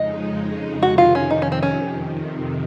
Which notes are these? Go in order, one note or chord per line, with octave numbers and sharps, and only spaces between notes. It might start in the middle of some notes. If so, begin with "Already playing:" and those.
Already playing: F2 C#3 G#3 D#4 D#5
F2 C3 D#3 F#4
F4
C#4
D#4
C#4
C4
C#4